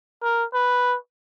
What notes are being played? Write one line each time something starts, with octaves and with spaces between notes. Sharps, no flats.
A#4
B4